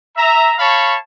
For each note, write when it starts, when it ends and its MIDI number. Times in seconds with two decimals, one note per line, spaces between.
0.17 0.54 76
0.17 0.54 82
0.59 0.97 73
0.59 0.97 77
0.59 0.97 81
0.59 0.97 83
0.59 0.97 85